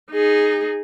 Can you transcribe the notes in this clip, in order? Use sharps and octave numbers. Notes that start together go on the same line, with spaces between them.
D#4 G#4